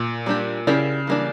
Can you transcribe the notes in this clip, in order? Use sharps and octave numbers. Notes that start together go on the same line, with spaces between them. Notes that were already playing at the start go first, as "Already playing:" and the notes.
Already playing: A#2
G3 A#3 D4 G4
C#3 C#4 E4 G4 A#4 D5
E3 G3 A#3 D4